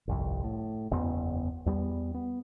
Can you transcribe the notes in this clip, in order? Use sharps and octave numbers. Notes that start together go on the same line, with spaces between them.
G1 C2 F2
A2
F#1 E2 B3
E2 G3 B3
B3